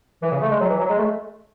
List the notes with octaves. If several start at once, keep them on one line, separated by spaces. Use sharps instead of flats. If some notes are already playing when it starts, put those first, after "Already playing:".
E3
C#3
A3
G#3
F#3
E3
F#3
G#3
A3